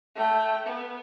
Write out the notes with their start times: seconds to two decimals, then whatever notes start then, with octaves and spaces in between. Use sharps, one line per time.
0.15 A3 G5
0.66 B3